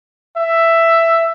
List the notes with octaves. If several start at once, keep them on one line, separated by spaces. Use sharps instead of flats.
E5